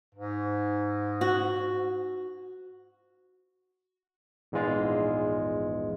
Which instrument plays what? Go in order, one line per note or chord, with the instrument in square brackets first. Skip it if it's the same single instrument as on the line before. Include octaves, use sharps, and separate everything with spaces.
[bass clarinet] G#2
[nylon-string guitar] F#4
[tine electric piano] A#1 E2 G#2 G#3 F4